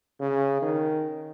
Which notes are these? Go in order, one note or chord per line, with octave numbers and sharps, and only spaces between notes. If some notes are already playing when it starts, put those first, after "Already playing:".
C#3
D#3